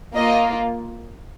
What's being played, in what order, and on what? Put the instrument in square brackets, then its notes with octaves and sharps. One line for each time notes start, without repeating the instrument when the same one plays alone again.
[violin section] A#3 F4 D#5